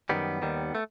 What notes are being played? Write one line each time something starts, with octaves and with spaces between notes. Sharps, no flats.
F#2 D#3 G3 B3
D#2 D#3 G3
A3